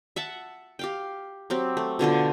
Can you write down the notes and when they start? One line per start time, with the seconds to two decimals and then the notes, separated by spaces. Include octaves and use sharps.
0.16 E5 F#5 A5
0.79 G4 F5 G5
1.50 F#3 C4 G4
1.77 A3
1.99 B2 D3 F4 C5